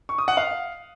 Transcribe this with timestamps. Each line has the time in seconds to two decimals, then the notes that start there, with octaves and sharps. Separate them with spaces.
0.09 C#6
0.18 D#6
0.28 F#5
0.37 F5